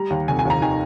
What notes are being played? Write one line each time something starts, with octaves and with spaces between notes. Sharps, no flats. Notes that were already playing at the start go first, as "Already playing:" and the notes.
Already playing: G3 A#5
D#2
F1 G#5
G#5
D#2 A#5
D#3 G#5